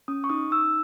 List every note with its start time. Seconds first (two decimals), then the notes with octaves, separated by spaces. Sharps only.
0.08 C#4 D#6
0.24 C#6
0.30 D#4 D#6
0.51 D#4 E6